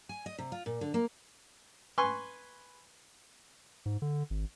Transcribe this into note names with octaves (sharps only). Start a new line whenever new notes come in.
G#5
D#5
C3
F4
A#2
D3
A#3
B4 G#5 C6 C#6
G#2
D3
G#1